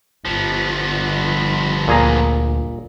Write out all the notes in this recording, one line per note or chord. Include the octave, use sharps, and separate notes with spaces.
G1 F3 B3
D2 A#2 G#4 A#5